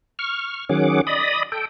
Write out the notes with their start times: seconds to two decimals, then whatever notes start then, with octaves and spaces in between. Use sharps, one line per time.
0.19 C#6 F6
0.69 D#3 F#3 C#4 G#4 F#5 D6
1.07 D5 D#5 B5 D#6
1.52 A4 G5